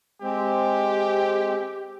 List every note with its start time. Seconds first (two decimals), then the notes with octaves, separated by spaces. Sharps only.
0.22 G#3 C4 G4